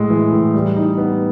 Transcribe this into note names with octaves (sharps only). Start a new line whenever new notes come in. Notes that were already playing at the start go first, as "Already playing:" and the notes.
Already playing: A2 G#3
E3
A2
G3
D#4
B3